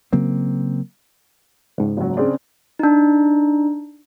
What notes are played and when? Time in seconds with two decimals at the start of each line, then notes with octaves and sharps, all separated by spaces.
0.13 C#3 F#3 A#3 C4
1.78 C#2 G#2
1.97 F#1 F#3
2.17 C#3 C4 D4
2.79 D4 D#4